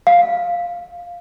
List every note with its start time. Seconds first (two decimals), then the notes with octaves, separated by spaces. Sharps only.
0.07 F5